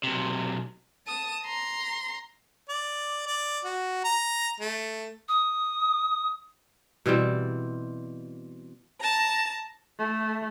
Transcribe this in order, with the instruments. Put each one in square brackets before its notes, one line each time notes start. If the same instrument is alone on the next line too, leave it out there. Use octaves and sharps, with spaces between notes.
[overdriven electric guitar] B1 C3
[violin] A5 D#6
A#5 C6
[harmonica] D5
D5
F#4
A#5
A3
[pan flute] D#6
[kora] B2 E3 G3 C4
[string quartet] A5 A#5
[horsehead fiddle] A3